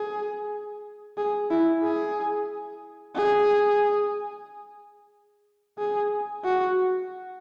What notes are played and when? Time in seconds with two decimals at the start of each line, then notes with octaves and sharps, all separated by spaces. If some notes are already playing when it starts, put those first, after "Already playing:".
Already playing: G#4
1.17 G#4
1.51 E4
1.83 G#4
3.15 G#4
5.79 G#4
6.44 F#4